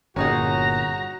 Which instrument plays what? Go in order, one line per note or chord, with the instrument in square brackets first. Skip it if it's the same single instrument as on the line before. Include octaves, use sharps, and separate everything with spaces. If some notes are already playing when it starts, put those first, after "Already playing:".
[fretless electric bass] G1 A#2 [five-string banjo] C#4 D#4 G#4 [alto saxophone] F#4 [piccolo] A#5